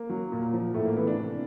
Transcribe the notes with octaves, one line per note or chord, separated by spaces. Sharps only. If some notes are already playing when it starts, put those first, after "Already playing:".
Already playing: A#3
F#3
A#2
F3
A2 A3
A#3
E3 B3
D4
C3